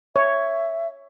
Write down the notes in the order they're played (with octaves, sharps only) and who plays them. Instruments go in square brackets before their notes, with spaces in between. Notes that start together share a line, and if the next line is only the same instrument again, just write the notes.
[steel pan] C#5 [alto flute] E5